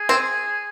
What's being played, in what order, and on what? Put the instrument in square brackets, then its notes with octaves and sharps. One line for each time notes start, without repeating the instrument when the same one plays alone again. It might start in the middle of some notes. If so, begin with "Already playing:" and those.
Already playing: [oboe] G#4
[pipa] C4